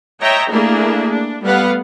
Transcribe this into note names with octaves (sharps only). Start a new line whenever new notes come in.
C#5 D#5 E5 G5 A#5
A3 A#3 D4 E4 G#4
D4
G3 A3 B3 B4 F5 F#5